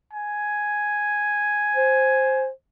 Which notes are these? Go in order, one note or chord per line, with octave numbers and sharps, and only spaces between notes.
G#5
C5